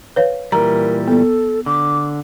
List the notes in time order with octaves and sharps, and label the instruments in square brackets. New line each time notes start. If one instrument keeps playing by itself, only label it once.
[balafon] B4 C#5 F5
[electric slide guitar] A#2 E3 G3 [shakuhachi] A#4 [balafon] A#5
[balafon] B3 [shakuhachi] A4
[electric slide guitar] D3 [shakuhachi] D6